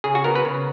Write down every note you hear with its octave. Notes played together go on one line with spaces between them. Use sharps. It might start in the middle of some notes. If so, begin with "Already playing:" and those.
C#3 G#4
F#4
B3 A#4
B4
C#3